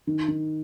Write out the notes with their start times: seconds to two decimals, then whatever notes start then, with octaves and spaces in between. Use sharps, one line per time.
0.07 D#3
0.28 D#3